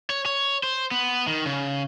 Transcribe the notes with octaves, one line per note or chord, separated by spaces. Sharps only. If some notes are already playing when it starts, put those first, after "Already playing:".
C#5
C#5
C5
B3
D#3
C#3